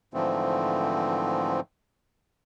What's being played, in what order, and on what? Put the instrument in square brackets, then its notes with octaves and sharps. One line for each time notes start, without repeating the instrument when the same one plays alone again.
[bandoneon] G#2 D3 E3 F3 A3 C4